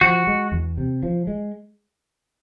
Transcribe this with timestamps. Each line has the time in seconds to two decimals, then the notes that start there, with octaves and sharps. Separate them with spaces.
0.01 F3 F#4
0.27 G#3
0.52 E2
0.78 C3
1.03 F3
1.27 G#3